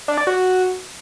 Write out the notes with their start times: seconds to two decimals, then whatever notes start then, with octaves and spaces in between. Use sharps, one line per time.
0.08 D4
0.18 D5
0.27 F#4